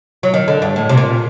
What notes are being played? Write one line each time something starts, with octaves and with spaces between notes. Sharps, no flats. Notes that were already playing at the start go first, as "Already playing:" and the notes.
F#3
D#3
D3
G2
A2
C3
A#2